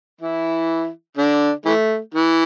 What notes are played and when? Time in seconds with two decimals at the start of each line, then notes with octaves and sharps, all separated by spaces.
0.21 E3 E4
1.17 D3 D4
1.65 E3 A3
2.14 E3